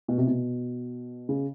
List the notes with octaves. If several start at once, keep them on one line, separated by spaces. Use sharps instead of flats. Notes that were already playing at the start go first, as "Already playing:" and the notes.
B2
C3
B2
C#3